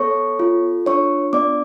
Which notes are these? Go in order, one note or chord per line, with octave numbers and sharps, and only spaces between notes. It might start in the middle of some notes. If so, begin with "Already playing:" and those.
Already playing: B3 A4 C#5 C#6
F4
D4 C#5 C#6
B3 D5 D6